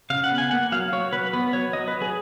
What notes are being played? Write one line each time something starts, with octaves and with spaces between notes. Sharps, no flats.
C#3 F5
F#5
B3
G#5
A#3 F#5
F#3 F5
F#3 C#5
F#3 B4
B3 B4
F#3 C#5
F#3 D#5
B4
F#3
G#4